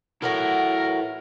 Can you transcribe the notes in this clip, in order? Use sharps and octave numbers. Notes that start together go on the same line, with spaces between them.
E3 F#3 E4 F#4 A4 A#4